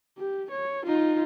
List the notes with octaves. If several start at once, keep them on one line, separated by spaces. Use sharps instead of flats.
G4
C#5
D#4 F4